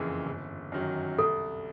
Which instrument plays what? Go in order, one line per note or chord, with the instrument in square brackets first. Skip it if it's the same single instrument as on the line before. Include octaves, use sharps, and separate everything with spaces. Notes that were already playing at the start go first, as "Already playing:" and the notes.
Already playing: [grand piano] F#1 F2 C#3 E3
G1
F#2 D#3 F#3
[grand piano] C2 [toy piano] A4